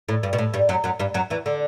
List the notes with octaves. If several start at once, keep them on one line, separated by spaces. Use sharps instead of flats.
A2
G2
B2
A2
G2 G3
F#2 F#3
F#2 F#3
G2 G3
F#2 F#3
E2 E3
D3